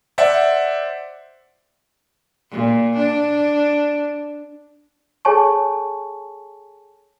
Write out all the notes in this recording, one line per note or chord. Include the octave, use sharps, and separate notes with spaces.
C5 D5 E5 F#5
A#2
D4
G#4 A4 C#5 G#5 A5 C#6